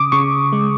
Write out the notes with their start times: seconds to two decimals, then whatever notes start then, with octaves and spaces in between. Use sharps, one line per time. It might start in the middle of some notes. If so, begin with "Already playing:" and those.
Already playing: C#3 D6 D#6
0.12 C#3 C#6
0.52 G#3